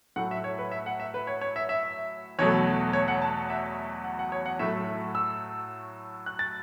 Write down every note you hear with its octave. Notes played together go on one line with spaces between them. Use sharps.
A2 F#3 A3 F#5
E5
C#5
B4
E5
F#5
E5
B4
C#5
C#5
E5
E5
E2 B2 F#3 A3 C#5
C#5
F#5
A5
E5
F#5
F#5
C#5
F#5
A2 F#3 A3 E5
E6
F#6
A6